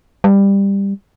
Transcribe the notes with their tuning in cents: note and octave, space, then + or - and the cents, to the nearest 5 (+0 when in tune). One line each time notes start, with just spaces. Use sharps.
G3 +15